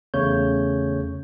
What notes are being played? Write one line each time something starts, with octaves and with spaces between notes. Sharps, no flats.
E2 C#3 A3 C#5 G6